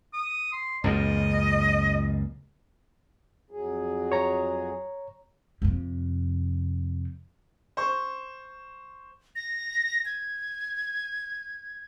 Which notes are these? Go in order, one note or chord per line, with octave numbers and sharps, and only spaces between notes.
D#6
C6
C#2 F#2 A#2 D#5
F2 F#3 G#4
C#5 A#5
F2 C3
C5 C#6
A#6
G#6